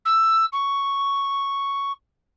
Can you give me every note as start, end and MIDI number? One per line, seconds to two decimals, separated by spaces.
0.05 0.46 88
0.53 1.92 85